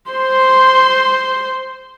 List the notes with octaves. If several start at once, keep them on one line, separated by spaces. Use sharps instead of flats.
C5 C6